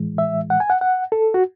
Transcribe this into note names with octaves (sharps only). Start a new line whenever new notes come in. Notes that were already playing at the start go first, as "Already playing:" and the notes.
Already playing: A2 E3 G#3
E5
F#5
G#5
F#5
F#5
A4
F#4